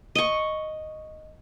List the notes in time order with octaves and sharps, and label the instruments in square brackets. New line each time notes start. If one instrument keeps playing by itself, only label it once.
[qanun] D#5 C#6